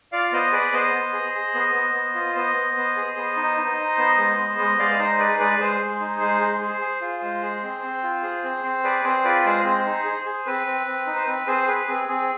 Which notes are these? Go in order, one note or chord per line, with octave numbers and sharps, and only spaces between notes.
F4 D5 F5
B3 C5 D#5
G#4 B4 D5
B3 C5 D#5
B3
G#4
G#4
B3
B3
B3
F4
B3 C5 D#5
B3
B3
G#4
B3
D#4
D#4
D#4
B3
G#3
B3
G#3
G#3 D5 F5
D#4 C5 D#5
G#4 B4 D5
G#3 B4 D5
G#3 G#4 C5
G#3
D#4
G#3
G#4
G#4
G#4
F4
G#3
G#4
C4
C4
F4
G#4
C4
C4
G#4 B4 D5
C4 G#4 C5
F4 B4 D5
G#3 G#4 C5
C4 G#4 C5
D#4
G#4
G#4
C4 B4
C4
C4
D#4
C5
C4 B4
C4 G#4 C5
G#4 B4
C4 G#4
C4 G#4